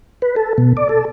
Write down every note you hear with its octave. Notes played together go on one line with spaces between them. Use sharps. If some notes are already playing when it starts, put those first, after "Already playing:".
B4
A4
B2
D5
A4